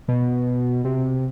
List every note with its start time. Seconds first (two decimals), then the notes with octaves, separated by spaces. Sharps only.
0.08 B2
0.85 C3